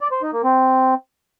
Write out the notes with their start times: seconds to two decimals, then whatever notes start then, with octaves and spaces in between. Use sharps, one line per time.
0.01 D5
0.11 C5
0.22 D#4
0.33 A#3
0.44 C4